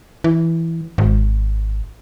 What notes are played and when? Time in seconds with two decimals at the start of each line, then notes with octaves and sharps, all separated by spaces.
0.24 E3
0.98 G#1